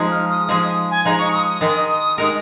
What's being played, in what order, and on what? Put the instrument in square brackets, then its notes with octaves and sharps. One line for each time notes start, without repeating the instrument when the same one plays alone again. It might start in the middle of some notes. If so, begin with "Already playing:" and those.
Already playing: [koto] F3 G#3 D#4 G#4
[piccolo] F6
D#6
[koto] F3 G#3 D#4 G#4 [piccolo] D#6
[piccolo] D#6
G#5
[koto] F3 G#3 D#4 G#4 [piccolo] A#5
[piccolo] C#6
D#6
D#6
[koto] D#3 G#3 D#4 A#4 [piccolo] D#6
[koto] D#3 G#3 D#4 A#4